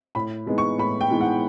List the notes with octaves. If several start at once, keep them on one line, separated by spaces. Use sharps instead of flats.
A2 B5
E3 G#3 B3 D#4
C#6
A2 B5
G5
E3 G#3 B3 D#4
F#5